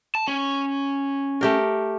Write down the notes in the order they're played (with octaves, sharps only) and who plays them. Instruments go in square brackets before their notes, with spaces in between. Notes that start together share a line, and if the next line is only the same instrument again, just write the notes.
[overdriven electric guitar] A5
C#4
[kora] A3 G4 A#4